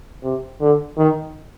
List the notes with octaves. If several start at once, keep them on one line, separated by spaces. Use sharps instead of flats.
C3
D3
D#3